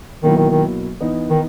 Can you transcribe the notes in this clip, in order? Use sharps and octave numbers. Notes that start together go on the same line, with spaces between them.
B2 D#3 F#3 A#3 E4
D#3
D#3
E3 B3 D#4
D#3